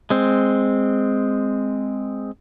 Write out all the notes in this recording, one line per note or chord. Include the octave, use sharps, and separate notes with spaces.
G#3 C4